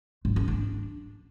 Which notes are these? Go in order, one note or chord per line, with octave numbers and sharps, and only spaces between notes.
G#2
C#4
D4